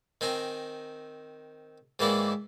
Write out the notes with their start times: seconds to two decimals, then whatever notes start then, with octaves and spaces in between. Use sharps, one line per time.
0.21 D#3 C4 G#5 A#5
1.99 G#2 D#3 E3 A#3 E4 D5